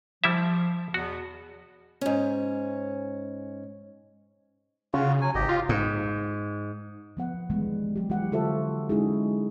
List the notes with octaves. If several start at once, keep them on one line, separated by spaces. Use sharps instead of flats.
F3 G3 E4 E5
E2 B2 B3 F#4
G#2 C#4
C#3 F4 F#4
F#3 G#5
G#1 G4 D#5
F4
G#2
F3 B3 F#5
D#3 E3 G3 G#3 B3
F#3 G4
E3 G#3 F#4 G4 F#5
D3 F4 F#4 A4 C5 E5
G#3 C#4 D#4 E4 F#4 G#4